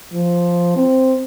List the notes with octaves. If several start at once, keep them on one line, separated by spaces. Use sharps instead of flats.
F3
C4